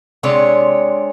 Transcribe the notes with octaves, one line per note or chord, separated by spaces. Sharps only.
C3 G#3 D4 C#5